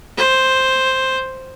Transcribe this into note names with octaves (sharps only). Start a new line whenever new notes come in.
C5